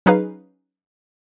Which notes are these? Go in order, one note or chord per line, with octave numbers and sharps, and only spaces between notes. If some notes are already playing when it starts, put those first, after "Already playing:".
F#3 C#4 D#4 G#4 B4 F5